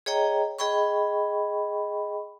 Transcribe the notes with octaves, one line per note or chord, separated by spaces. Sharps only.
G#4 C#5 D#5 G5 A#5
G#4 D#5 G5 B5 C#6